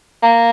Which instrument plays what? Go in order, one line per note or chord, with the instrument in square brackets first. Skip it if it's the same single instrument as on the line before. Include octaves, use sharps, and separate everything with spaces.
[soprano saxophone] A#3